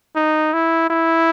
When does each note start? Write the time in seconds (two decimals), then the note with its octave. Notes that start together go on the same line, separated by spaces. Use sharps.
0.16 D#4
0.53 E4
0.90 E4